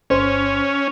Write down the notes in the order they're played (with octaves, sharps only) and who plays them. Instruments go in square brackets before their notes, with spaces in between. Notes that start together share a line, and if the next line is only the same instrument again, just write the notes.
[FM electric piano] G1 C5 [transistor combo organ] C#4